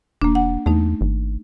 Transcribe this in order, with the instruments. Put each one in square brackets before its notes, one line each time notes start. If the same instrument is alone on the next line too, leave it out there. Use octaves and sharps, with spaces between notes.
[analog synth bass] E1 [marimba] A#3 D4
[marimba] F#5
[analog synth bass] E2 [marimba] A3 D#4
[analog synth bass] G#1